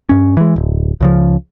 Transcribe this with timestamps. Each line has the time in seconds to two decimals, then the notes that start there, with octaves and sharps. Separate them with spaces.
0.09 G2 C#4
0.37 E3 G#3
0.56 D1
1.01 C#2 C#3 F3